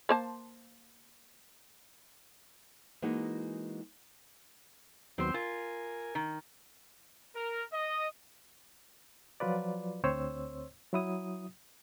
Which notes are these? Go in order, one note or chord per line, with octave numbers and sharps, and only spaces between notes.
A#3 C5 A5
E3 G#3 A#3 D#4 F#4
D#2 F#3 B3 C4 C5
F4 A#4 G#5
D#3
A#4
D#5
F3 F#3 F4 B4 D5
D2 C4 C5 C#5 E6
F#3 E4 D#6